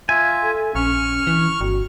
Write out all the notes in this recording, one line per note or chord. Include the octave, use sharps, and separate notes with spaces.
F4 E5 G#5
A4
A#1 C#4 C#6 F6
E3
G1 F#4